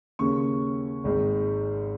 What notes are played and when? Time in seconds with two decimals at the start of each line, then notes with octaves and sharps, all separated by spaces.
0.19 D#2 C#3 A#3 C#4 C#6
1.04 G#1 G#2 D#3 G#3